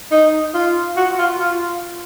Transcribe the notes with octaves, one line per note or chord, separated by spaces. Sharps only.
D#4
F4
F#4
F4
F4